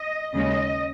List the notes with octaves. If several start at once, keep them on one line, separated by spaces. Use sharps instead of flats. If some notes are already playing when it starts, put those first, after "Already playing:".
Already playing: D#5
D#2 C#3 G#3 C#4 D#5